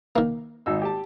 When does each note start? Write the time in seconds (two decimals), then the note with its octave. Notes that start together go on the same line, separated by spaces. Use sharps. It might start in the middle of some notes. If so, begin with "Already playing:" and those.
0.16 D#3 A#3
0.66 G#1 D#4 E6
0.82 G4 A5